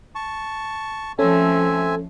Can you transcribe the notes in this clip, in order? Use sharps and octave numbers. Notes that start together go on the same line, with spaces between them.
A5 C#6
F3 A3 C4 C#4 A4 E5 G#5